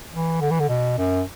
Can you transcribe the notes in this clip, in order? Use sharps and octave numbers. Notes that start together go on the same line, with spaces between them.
E3
D3
E3
D3
B2
F#2